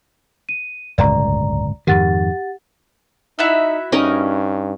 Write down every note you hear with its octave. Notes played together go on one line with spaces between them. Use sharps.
D#7
D1 G1 C#2 D5 A#5
F2 G#2 D#3 G4 F#5 A6
D#4 E4 F#4 E5
G2 C#4 D#4 A#4